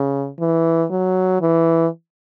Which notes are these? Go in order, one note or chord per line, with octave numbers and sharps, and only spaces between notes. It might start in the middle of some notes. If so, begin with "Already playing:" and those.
Already playing: C#3
E3
F#3
E3